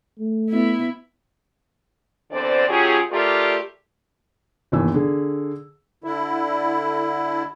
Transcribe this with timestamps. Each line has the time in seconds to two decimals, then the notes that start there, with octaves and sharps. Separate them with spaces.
0.19 A3
0.50 B3 E4
2.32 E2 D3 C4 C5 D5
2.69 F#3 C#4 F4 G4 G#4
3.11 A3 F4 G4 A#4 D5
4.72 G1 D#2 E3 E6
4.94 D3 G#4
6.04 D3 E4